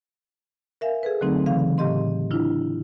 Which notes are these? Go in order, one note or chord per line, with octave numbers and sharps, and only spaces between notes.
A#4 E5 F5 G#5
G#4 A4 B4
D3 F#3 A3 C4 D#4
C#3 E3 F5
A2 G4 D#5 C6
D4 E4 F4